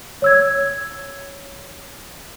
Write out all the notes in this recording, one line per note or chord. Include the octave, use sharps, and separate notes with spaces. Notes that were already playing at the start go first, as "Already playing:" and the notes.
C#5 E6 G#6